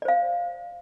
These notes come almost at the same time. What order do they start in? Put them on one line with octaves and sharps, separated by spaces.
D5 C5 F5